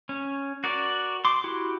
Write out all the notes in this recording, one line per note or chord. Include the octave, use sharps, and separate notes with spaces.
C#4
F#4 A#4 D5
C6 D6
E4 F#4 G4